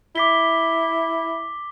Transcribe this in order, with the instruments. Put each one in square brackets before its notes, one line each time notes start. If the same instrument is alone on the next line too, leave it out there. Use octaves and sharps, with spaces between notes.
[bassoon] E4 [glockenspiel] D6 B6 G7